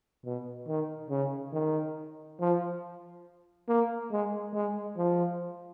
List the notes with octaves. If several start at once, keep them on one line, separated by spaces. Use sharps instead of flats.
B2
D#3
C#3
D#3
F3
A#3
G#3
G#3
F3